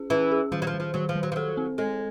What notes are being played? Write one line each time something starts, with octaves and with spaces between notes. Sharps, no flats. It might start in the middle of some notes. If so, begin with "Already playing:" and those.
Already playing: C#4 G#4
E3 C#4
G#4
D#3 F3
F#3
F3
D#3
F3
D#3 F#3
F3
D#3
F#3
F3
F#3 A4
C4
G#3 A4